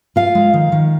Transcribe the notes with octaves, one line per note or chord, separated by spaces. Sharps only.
F4 F5
G#3
D#3
D#3